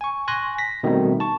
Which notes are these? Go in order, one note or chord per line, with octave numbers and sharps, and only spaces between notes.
G#5 C#6
G#5 C6 C#6 F#6 A#6
A#6 B6
B2 D#3 G3 A3 C4 D#4
A5 C#6